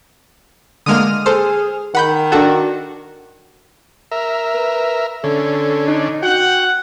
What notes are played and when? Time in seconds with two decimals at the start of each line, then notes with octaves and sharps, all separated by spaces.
0.86 D3 G#3 A#3 D#6 F6
1.26 G#4 A4 C5
1.95 D#3 F#5 B5 G6
2.32 D4 F#4 A4
4.11 A#4 E5
4.54 B4
5.24 D3 C#4 A4
5.88 D4 D#4
6.22 F#4 F#5 G5